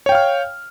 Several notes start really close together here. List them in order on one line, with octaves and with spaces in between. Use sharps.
C#5 G5 F5 F6